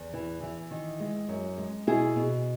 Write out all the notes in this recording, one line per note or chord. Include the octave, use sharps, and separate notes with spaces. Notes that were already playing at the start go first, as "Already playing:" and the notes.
Already playing: E2
E3
E3
D#3
G#3
F#2
G#3
B2 E4 G#4
B2